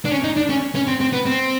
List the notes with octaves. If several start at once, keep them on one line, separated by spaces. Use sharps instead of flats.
D4
C#4
D#4
D4
C#4
C#4
C4
C4
B3
C4